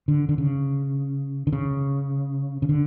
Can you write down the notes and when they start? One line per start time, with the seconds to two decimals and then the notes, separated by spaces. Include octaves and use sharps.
0.08 D3
0.29 D3
0.38 C#3
1.47 D3
1.53 C#3
2.62 C#3
2.69 D3